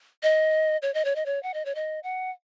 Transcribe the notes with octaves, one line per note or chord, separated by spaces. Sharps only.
D#5
C#5
D#5
C#5
D#5
C#5
F#5
D#5
C#5
D#5
F#5